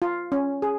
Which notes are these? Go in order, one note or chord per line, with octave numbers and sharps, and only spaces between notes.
F4
C#4
G#4